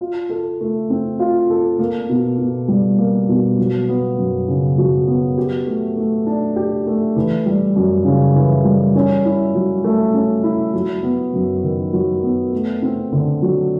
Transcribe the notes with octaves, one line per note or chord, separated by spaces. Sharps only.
F4
A4
A3
C4
F4
A4
A#3
B2
B2
G3
A#3
B2
F#3
B3
F#2
C#3
F#3
B3
G4
A3
A3
D4
G4
A3
E3
G3
F#2
C#3
E3
G3
C#4
E4
F#3
A3
C#4
E4
F#3
B3
F#2
D#3
F#3
B3
A3
C4
D3
F#3